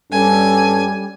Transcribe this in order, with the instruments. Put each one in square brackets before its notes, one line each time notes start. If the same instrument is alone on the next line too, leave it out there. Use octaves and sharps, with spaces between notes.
[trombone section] G2 A4 [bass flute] G3 [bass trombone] C#4 [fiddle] G#5